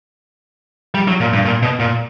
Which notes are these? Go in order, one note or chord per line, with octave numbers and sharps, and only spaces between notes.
G3
F#3
A#2
G2
A#2
B2
A#2